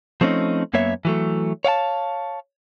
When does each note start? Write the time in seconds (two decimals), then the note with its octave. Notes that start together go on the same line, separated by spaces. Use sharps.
0.21 F3 A3 C4 C#4 D#4
0.74 F#2 A#3 B3 C#5 E5
1.05 E3 F#3 A3
1.65 C#5 F5 F#5 A5